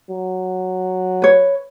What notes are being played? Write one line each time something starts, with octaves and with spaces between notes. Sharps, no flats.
F#3
B4 C#5